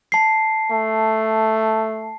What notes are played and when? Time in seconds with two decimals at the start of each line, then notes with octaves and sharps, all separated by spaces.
0.12 A5 C7
0.71 A3